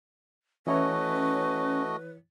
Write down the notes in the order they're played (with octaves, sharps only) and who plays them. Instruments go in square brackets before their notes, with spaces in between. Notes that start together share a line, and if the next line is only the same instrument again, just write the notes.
[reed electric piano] E3 E4 C#5 [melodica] A3 F#4 D#5 [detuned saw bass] C#4 [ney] B4